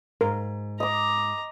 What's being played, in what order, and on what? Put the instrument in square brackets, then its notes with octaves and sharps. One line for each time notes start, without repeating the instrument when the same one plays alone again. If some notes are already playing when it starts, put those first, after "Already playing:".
[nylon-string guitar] G#2 [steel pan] A#4
[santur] D#5 D6 [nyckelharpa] A#5